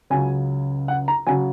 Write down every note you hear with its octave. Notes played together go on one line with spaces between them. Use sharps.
C#2 C#3 F#3 G#5
F#5
A#5
C#3 F#3 G#5